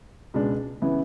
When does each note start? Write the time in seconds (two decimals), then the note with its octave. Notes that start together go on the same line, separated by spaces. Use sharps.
0.34 C#2 B2 G#3 D4
0.82 C#3 E3 B3 E4